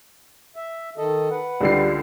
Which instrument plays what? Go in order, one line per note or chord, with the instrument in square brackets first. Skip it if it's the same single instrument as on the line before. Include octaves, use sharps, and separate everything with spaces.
[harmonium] E5
D#3 A4 D#5
B4 F#5
[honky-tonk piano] C#2 D3 C7 [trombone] G3